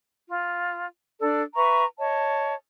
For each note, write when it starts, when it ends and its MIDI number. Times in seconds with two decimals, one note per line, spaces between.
0.28 0.84 65
1.20 1.42 62
1.20 1.42 69
1.20 1.42 74
1.55 1.83 71
1.55 1.83 76
1.55 1.83 82
1.55 1.83 85
1.98 2.54 73
1.98 2.54 75
1.98 2.54 81